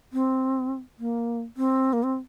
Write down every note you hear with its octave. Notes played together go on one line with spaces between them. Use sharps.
C4
A#3
C4
A#3
C4